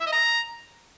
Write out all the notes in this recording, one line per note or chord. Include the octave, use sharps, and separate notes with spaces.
E5
D#5
A#5